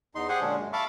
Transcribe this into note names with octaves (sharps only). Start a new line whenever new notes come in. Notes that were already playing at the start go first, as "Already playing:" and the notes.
E2 D#4 C6
G4 G#4 C5 F#5 G#5
A#2 D3 G#3 C#4 D4
F#2 G#3
E5 F5 A5 B5 C#6 D6